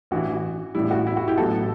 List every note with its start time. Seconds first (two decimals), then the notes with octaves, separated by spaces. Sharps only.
0.11 A1 G2 E3 F#4
0.75 A1 A2 G3 E4
0.91 F#4
1.07 E4
1.17 F#4
1.28 E4 G4
1.38 A1 A2 F#3 B3 F#4 A4